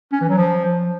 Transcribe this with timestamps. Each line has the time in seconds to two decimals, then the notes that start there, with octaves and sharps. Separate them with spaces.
0.12 C#4
0.21 E3
0.29 F#3
0.37 F3